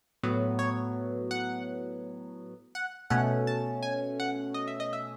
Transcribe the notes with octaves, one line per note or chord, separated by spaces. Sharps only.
A2 F#3 B3
C#5
F#5
F#5
B2 A3 C#4 F#5
A5
G#5
F#5
D#5
E5
D#5
E5